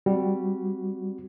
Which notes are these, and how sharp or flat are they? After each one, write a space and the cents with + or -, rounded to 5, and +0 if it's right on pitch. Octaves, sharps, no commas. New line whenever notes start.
G3 +0 C4 +0 F#4 +0